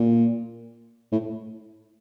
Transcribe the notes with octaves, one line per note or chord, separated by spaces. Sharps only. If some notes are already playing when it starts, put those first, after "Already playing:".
Already playing: A#2
A2